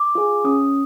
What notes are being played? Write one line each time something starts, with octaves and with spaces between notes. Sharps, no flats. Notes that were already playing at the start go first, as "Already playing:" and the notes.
Already playing: D6
F4 G#4
C#4 D#6